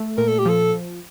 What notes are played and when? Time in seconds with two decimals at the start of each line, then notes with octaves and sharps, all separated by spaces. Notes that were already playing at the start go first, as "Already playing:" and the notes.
Already playing: A3
0.17 A#2 A#4
0.28 A4
0.38 G4
0.46 F3 A4